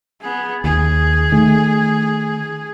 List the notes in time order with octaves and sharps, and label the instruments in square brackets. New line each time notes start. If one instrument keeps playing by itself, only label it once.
[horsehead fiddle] B3 G#4
[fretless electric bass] D#2 [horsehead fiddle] G#4
[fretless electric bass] D#3 A3